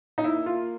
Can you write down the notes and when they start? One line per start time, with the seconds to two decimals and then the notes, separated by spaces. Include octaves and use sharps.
0.18 D#4
0.24 A#3 E4
0.46 F4